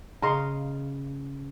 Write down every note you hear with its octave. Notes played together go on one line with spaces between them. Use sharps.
C#3 D#5 F5 A#5 C6